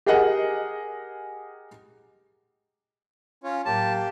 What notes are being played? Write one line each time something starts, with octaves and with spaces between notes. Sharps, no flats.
G4 G#4 A#4 D#5 F#5
C#4 F4 C#5
A2 F#3 A#3 G4 A5